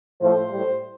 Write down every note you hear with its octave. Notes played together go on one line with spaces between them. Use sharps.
A2 F3 A3 C5
A2 G3